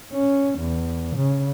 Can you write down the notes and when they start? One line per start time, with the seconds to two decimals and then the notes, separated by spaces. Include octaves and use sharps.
0.13 C#4
0.59 E2
1.16 C#3